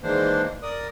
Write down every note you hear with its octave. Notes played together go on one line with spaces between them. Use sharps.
D#3 E3 G#3 A#3 D4 C5
A#4 D5 D#6